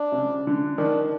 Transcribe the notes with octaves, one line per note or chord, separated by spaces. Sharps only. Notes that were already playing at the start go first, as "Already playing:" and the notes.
Already playing: D4
C3
C#3
D3
D#3 D4